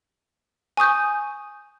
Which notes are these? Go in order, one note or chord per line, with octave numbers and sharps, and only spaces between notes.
G#5 C#6 D#6 G6